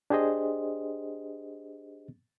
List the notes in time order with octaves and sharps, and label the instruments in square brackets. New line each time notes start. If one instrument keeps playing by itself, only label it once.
[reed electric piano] D4 G4 G#4 C5 D#5